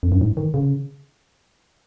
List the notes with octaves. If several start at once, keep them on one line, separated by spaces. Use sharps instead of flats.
F2
F#2
G#2
D#3
C#3